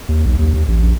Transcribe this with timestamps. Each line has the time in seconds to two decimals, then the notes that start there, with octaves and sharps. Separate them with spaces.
0.09 D#2
0.26 B1
0.39 D#2
0.54 D#2
0.68 A1
0.83 A#1